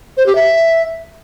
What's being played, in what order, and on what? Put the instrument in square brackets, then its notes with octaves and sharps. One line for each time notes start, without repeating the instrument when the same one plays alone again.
[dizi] C5
G4
E5